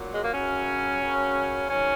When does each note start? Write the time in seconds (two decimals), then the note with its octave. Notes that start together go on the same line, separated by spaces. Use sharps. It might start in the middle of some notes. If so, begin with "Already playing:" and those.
Already playing: A#2 F#3
0.14 G#3
0.24 A#3
0.34 F#2 C#3 F#3 C#4
1.01 F#2 C#3 F#3
1.69 G#2 D#3 F#3 C#4